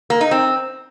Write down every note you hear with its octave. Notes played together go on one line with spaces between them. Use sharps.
A#3
D#4
C4